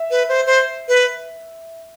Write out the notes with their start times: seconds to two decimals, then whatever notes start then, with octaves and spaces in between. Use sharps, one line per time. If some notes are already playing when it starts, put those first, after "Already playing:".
Already playing: E5
0.11 B4
0.29 C5
0.46 C5
0.88 B4